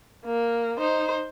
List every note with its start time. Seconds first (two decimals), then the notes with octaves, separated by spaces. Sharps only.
0.25 A#3
0.79 D#4 C5